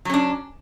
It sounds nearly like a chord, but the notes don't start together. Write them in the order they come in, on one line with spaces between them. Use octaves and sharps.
F#3 C#4 D4